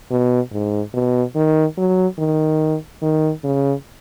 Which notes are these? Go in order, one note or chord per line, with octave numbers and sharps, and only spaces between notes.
B2
G#2
B2
D#3
F#3
D#3
D#3
C#3